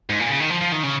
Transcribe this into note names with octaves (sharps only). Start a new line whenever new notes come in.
G#2
A#2
C#3
D#3
F3
F3
D#3
C#3